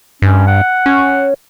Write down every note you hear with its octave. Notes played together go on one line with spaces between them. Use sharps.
G2 C#4
F#5
C#4